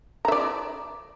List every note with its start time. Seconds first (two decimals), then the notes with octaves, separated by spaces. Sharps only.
0.25 A#5
0.28 E5
0.32 D5